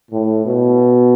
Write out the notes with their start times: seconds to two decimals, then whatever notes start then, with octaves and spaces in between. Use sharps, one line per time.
0.11 A2
0.46 B2